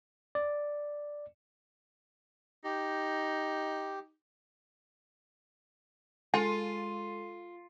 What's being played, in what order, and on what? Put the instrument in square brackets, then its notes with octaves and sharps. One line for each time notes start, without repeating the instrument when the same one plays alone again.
[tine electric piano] D5
[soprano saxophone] D#4 [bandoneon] G4
[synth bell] G#3 A4 D#7 [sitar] F4 [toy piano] G#5